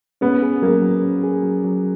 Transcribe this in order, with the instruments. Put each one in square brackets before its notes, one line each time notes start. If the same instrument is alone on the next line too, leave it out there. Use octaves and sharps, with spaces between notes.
[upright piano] B3 [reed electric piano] C#4
[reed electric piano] G#4
[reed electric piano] F#3 [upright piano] A#3
[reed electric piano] F#3
C#4
G#4
F#3
F#3